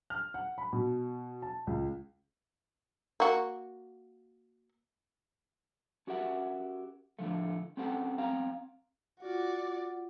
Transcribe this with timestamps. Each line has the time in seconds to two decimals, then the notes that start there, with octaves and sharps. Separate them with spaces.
0.10 F6
0.34 F#5
0.58 B5
0.73 B2
1.42 A5
1.67 C#2
3.20 A#3 F#4
6.07 C#4 F#4 G4 A#4 E5 F#5
7.19 A2 D3 F3 A3
7.77 C4 C#4 G4 A4 C5 F#5
8.18 B3 C4 F5 A#5
9.20 F4 F#4 D5 F#5